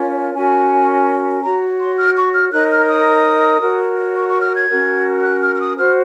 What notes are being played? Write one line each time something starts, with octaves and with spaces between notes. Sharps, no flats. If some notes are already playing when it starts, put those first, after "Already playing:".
Already playing: C#4 F4 A#4 C#5
C#4 F#4 A#4 G#5
F#4 C#5 A#5
C6
F6
C#6
F6
D#4 A#4 C#5 F#6
F6
D#6
F#4 A#4 C#5
C#6
C#6
F6
G#6
C#4 F#4 A#4
F#6
F6
F6
D#6
F#4 C5 F6